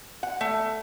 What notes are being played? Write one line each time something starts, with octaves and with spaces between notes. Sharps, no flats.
F#5
A3